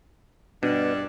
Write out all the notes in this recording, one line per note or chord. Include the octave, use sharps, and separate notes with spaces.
G2 B2 D4